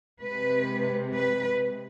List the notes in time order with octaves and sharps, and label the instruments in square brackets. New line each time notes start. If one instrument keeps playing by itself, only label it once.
[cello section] C3 G#3 B4
B4